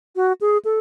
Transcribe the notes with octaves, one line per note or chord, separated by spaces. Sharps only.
F#4
G#4
A4